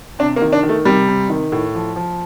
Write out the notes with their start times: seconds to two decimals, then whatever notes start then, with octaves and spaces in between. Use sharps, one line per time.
0.19 C3 D4
0.36 A#3
0.42 D#3
0.53 D4
0.63 D#3
0.69 A3
0.85 C3 G3
1.08 C3
1.29 D#3
1.52 A2
1.75 F3
1.96 F3